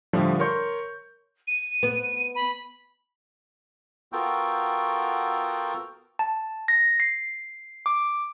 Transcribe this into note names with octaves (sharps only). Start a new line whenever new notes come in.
A2 D3 F3 G3
A#4 C#5 C6 C#6 G6
D#7
B3
B5
B3 F4 F#4 A4 A#4 G5
A5
A#6
C7
D6